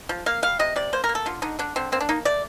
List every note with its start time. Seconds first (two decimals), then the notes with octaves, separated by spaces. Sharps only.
0.09 F3
0.26 A#3 F5
0.43 G3 F5
0.59 C3 D#5
0.76 C3 D5
0.93 A#3 C5
1.04 A#4
1.09 A#3
1.15 A4
1.26 D3 F4
1.42 D3 D#4
1.59 D3 D4
1.76 D3 C4
1.92 A#3 C4
2.01 D4
2.09 A#3 D#4
2.25 A3 D5